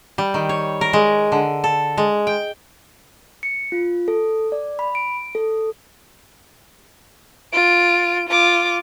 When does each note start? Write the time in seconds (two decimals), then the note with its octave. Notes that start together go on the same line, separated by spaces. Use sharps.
0.18 G3
0.34 D#3
0.49 C#5
0.81 A#4
0.93 G#3
1.32 D3
1.64 A4
1.98 G#3
2.27 G5
3.43 C#7
3.72 F4
4.08 A4
4.52 D5
4.79 B5
4.95 D7
5.35 A4
7.53 F4 D7
8.29 F4 D6